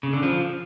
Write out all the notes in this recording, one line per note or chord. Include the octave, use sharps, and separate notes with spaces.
C#3
D3
F3